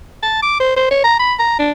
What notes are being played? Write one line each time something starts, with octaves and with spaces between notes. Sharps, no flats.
A5
D6
C5
C5
C#5
A#5
B5
A#5
D4